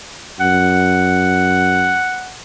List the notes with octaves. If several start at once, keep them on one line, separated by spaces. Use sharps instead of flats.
F#2 F#5